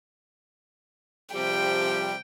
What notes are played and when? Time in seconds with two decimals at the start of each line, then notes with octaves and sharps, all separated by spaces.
1.34 C3 F3 G3 G5